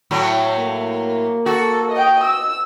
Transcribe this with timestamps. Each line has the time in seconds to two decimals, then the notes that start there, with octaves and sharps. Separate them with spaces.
0.11 A2 F#3
0.56 A#3
1.46 F#4 A4
1.92 D#5 G5
2.23 E6